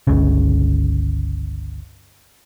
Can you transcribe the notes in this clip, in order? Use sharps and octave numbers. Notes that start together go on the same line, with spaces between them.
G1 C#2 C#3